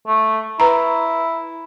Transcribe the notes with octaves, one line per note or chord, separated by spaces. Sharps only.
A3
E4 B4 A#5